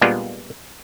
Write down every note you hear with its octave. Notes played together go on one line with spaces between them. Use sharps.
A#2 G3 G#3 B3 D4 F4